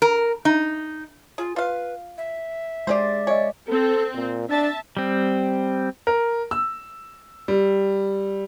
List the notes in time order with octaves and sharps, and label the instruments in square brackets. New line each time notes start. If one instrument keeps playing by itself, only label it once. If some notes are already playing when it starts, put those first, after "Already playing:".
[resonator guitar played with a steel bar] A#4
D#4
[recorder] F4 [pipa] G#4
[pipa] F4 F5 [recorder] B4
[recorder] E5
[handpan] G#3 D5 [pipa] G4 G#4 C5
[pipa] C#5 [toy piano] D#5 G#5
[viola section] C4 [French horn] A4
[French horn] A#2
[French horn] D4 [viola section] E5 A5
[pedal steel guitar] G3 C4
[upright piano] A#4
E6
G3